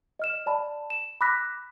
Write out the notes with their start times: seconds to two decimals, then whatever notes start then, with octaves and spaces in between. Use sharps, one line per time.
0.19 D#5 F6 E7
0.46 D5 A5 B5
0.90 E7
1.21 B5 D6 E6 F#6 A#6 B6